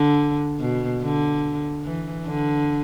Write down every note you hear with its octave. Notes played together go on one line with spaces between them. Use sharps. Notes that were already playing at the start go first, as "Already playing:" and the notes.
Already playing: D3
B2
D3
E3
D3